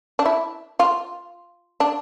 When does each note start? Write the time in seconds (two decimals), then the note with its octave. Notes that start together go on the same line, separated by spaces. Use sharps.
0.19 D4
0.26 E4
0.80 F4
1.80 D4